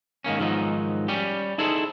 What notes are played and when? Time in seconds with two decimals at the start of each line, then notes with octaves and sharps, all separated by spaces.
0.24 G#2 D#3 A#3 C#4
0.39 G#2 D#3 F3 F#3 B3 D#4
1.08 G3 C#4 G4
1.58 D#4 E4 G#4 A4 C5